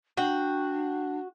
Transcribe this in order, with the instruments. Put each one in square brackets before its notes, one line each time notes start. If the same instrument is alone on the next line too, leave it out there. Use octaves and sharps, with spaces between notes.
[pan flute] D4 [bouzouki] F#4 [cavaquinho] G5